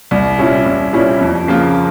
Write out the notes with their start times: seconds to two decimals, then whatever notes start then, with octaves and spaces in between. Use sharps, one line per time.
0.11 C2
0.38 A#2 G3 C#4 E4
0.66 C2
0.93 A#2 G3 C#4 E4
1.21 F2
1.47 C#3 F3 A#3 F4